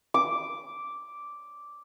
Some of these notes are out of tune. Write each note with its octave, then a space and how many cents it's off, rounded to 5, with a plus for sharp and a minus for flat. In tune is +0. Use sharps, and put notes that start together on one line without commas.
D6 -5